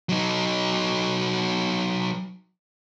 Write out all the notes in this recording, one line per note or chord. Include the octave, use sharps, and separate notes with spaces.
F#3 D#4